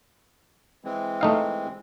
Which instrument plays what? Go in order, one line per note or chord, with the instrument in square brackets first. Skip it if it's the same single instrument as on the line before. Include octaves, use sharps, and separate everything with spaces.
[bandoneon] E3 G#3 C4
[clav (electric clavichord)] A3 D#4 F5